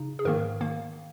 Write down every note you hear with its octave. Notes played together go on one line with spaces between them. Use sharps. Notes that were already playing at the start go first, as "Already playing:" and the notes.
Already playing: C#3 D#4
G#4
G#2 D#3 A#3 A#4
D#3 A#3 F5